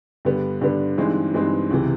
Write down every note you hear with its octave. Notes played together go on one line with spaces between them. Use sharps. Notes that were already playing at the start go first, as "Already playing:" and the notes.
G2 D3 G3 B3
G2 D3 G3 B3
G2 E3 G#3 C4 D#4
G2 E3 G#3 C4 D#4
C#2 C3 E3